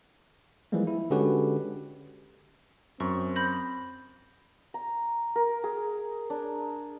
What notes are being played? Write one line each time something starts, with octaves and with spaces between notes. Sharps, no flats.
E3 F3 G3 G#3 A#3
E4
D3 G#3 C#4 F#4 G4 B4
F#2 C4 C#6
B5 G6 A#6
A#5
A#4
G#4
D4